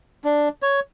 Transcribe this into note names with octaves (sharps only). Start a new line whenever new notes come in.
D4
C#5